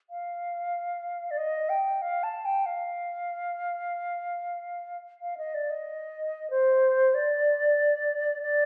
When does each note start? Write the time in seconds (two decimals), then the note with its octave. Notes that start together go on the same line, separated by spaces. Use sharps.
0.10 F5
1.31 D5
1.38 D#5
1.69 G5
2.02 F5
2.23 A5
2.45 G5
2.66 F5
5.22 F5
5.38 D#5
5.54 D5
5.70 D#5
6.50 C5
7.14 D5
8.42 D5